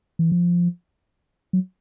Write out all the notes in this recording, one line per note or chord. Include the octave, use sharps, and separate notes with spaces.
E3
F3
F#3